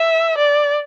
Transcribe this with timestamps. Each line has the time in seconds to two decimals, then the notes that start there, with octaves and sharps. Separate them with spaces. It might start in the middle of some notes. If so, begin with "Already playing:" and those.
Already playing: E5
0.38 D5